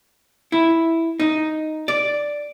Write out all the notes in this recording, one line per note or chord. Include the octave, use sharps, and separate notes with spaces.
E4
D#4
D5